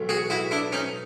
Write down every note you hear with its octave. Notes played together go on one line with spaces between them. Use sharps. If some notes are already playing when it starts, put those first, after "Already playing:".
Already playing: B1 A2 E3
F#4 G#4
E4 F#4
D4 E4
C#4 D#4